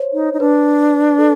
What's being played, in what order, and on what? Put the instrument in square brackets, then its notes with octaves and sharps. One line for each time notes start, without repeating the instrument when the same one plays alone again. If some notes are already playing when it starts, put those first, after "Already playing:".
Already playing: [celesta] C5 C#5
[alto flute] D#4
D#4
[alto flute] D4 [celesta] B4
[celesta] A4